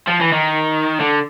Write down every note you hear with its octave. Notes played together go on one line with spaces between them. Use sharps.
F3
E3
D#3
D3